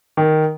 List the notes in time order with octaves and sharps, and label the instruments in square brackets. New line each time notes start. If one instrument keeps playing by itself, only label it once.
[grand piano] D#3